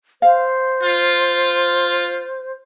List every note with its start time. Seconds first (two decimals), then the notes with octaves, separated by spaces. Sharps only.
0.22 C5 F5
0.82 F4